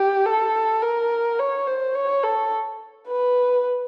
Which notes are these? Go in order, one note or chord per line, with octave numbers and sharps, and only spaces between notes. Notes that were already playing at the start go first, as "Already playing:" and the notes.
Already playing: G4
A4
A#4
C#5
C5
C#5
A4
B4